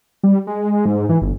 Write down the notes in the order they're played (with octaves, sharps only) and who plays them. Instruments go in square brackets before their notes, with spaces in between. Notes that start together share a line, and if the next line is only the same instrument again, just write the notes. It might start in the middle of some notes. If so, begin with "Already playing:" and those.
[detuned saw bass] G3
G#3
G#2
E3
G1